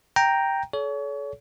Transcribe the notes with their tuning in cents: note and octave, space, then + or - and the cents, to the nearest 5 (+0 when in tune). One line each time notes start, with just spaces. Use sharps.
G5 +0 A#5 +0
A4 -40 C#5 +35